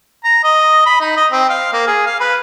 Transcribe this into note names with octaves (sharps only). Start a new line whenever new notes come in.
A#5
D#5
B5
D#4
D#5
C4
F5
A#3
G#4
F5
B4